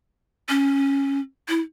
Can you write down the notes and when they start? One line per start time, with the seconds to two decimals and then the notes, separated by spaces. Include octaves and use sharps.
0.49 C#4
1.49 E4